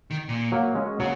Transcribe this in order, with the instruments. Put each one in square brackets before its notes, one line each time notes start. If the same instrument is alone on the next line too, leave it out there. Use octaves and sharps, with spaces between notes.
[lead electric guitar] D#3
A#2
[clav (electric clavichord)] F#3 A#3
G#3 C#4
[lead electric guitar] C#3 [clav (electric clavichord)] F#3 A#3